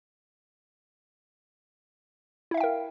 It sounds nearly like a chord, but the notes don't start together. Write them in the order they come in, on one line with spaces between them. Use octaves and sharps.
E4 E5 F5 G5 A#4